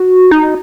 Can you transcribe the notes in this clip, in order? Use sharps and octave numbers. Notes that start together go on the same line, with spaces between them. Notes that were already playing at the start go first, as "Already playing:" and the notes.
Already playing: F#4
D#4